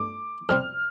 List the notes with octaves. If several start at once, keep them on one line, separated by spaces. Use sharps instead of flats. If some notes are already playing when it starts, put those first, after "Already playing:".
Already playing: G2 A3 D6
F2 C3 G3 C4 F6